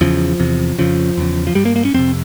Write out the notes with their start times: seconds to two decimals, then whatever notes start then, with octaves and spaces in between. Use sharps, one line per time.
0.01 E2 C#3 F3
0.40 E2 C3
0.78 F2 C#3 F3
1.17 E2 C#3
1.47 F3
1.55 G2 G3
1.65 A#3
1.76 A#3
1.85 C#4
1.94 F2 C3 C4